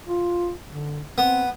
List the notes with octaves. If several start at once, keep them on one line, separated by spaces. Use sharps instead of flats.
F4
D3
B3 C4